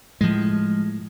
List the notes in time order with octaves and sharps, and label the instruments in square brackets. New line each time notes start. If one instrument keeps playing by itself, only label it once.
[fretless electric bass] A2 [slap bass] F3 G#3